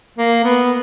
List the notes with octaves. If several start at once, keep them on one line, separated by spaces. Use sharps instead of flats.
A#3
B3